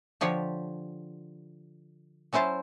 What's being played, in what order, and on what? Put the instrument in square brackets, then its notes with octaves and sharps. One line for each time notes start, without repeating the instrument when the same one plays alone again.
[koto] D3 F3 G4 C#5
F#3 C#4 E4 C5 A5